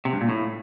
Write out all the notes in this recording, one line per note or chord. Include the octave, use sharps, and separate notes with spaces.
C3
G2
A#2
A2